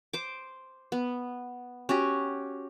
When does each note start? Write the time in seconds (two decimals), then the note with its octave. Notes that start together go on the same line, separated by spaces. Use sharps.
0.13 C5 D6
0.92 B3
1.89 C#4 F#4 G4